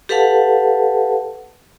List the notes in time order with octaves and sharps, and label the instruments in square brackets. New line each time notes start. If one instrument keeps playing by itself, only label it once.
[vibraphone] G4 A4 B4 F5 F#5 A5